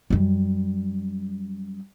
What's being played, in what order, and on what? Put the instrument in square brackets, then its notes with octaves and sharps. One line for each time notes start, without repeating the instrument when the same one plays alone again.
[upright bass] F#2 G3